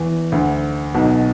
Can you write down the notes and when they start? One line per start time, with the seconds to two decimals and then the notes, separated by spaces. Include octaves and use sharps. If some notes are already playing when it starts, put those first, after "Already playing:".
Already playing: E2 E3
0.32 D2 D3
0.94 B1 B2